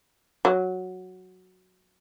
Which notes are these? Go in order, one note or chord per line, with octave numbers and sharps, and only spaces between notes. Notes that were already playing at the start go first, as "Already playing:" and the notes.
F#3